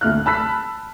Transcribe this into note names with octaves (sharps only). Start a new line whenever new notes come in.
D2 A3 F6 F#6
A5 B5 E6 F#6 B6